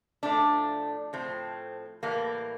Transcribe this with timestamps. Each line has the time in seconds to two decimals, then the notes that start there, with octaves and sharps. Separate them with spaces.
0.23 A2 F3 A3 D4
1.13 A2 F3 A3 C4
2.03 A2 E3 G3 A#3